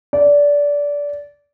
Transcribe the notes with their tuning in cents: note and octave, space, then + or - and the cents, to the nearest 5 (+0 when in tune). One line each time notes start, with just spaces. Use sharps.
D5 -20